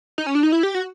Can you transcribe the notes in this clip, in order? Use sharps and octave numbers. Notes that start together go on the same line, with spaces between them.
D#4
C#4
D4
D#4
E4
G4
F#4